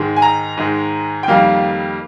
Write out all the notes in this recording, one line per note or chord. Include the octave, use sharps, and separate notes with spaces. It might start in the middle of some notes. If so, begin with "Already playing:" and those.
Already playing: G#2 D#3 G#3
G#5
A#5
G#2 D#3 G#3
G5
F2 D#3 G3 A#3 F5